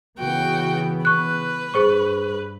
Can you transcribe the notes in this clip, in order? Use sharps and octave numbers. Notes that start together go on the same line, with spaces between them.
C#3 E3 B3 F#4 G5
B4 C#6 F#6
G2 G#4 C5 C#6